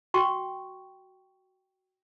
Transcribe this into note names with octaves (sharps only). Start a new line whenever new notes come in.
F#4 G5 C#6